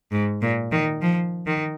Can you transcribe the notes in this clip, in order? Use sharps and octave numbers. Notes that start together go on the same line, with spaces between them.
G#2
A#2
D#3
F3
D#3